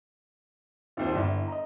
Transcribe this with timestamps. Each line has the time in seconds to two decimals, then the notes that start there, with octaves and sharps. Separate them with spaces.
0.97 A#1 D#2 C4 D#4 F4 C5
1.15 G1 G2 E4 D5
1.48 D#5 A#5